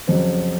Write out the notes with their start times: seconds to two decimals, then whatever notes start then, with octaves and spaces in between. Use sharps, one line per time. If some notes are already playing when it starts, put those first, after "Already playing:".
0.07 F2 C#3 F#3 C4 C5